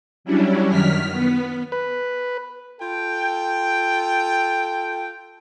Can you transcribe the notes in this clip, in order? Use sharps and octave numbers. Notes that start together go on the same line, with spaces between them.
F#3 G3 C#4 D4 E4
F#2 D#3 F6 B6
B3
B4
F4 A4 G5